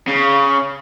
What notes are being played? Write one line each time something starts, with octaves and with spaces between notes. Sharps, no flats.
C#3